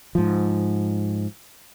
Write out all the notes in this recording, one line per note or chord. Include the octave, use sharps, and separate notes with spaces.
G#2 F3